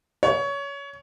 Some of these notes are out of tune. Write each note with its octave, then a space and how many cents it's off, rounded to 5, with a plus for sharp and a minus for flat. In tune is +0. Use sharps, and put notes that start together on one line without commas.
C#5 +20